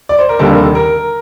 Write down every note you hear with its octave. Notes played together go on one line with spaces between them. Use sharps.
D5
C5
A#4
F1 D#2 D3 G3 A#3 A4
A#4